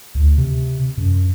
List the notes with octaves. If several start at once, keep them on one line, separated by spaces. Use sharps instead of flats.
D2
C3
F#2